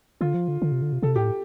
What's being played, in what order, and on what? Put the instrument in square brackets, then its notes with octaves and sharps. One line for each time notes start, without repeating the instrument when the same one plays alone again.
[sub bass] D3 [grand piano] F4
[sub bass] F3
D3
D3
C3
D3
C3
[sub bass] C3 [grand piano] A4
[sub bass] A2 [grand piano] G4